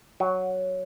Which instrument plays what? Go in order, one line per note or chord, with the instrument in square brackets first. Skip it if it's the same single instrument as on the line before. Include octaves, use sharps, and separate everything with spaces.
[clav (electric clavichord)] F#3